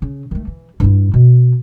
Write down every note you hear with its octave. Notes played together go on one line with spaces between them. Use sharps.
C#3
D#3 A3
E3
G2 E4
B2